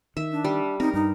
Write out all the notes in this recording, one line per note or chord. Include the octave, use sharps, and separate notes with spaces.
D#3 E5
D4
G3
C4 D#4 A#4
G2 D#4